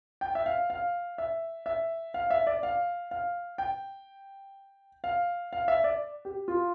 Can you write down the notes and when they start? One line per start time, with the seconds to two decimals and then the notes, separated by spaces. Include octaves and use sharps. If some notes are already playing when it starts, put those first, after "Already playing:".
0.21 G5
0.35 E5
0.46 F5
0.70 F5
1.18 E5
1.66 E5
2.14 F5
2.30 E5
2.47 D5
2.63 F5
3.11 F5
3.58 G5
5.04 F5
5.53 F5
5.68 E5
5.84 D5
6.25 G4
6.48 F4